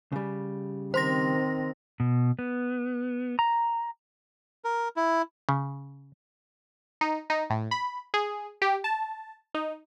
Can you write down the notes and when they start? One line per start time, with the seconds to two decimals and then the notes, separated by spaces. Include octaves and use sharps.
0.12 C#3 G3
0.94 D#3 C4 C5 C6 A#6
2.00 B2
2.39 B3
3.39 A#5
4.64 A#4
4.97 E4
5.49 C#3
7.01 D#4
7.30 D#4
7.50 A2
7.71 B5
8.14 G#4
8.62 G4
8.84 A5
9.54 D#4